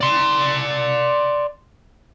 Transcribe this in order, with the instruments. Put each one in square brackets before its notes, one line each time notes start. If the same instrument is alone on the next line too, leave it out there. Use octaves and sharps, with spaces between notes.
[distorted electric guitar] D5 C6